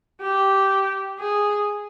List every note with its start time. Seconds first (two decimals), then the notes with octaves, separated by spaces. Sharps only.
0.21 G4
1.19 G#4